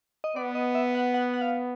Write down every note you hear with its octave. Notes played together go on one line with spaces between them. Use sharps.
D#5
B3 D5
D#5
E5
F#5
F#5
F#5
F5